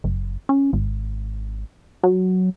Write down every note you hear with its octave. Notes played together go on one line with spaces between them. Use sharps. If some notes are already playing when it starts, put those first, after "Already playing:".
F#1
C#4
G#1
F#3